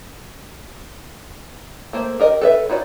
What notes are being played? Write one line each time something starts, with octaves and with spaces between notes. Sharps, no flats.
A3 A#3 C5
G4 A#4 D#5
A4 B4 E5
D#4 E4 F#4 D5